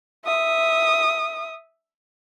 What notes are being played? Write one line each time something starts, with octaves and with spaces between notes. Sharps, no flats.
E5 D#6